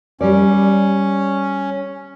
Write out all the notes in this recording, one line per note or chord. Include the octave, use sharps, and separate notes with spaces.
G3 C#4 D5